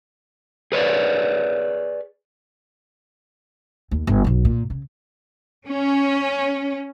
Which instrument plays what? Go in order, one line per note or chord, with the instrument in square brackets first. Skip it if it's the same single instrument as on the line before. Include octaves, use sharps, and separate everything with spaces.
[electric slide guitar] G#4 B4 C#5 D5
[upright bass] D#2
G1
B1 F#3
A#2
C#3
[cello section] C#4